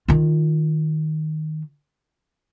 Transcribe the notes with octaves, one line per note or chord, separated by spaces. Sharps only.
D#3 F4